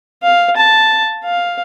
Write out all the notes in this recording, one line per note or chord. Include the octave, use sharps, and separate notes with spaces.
F5
A5
F5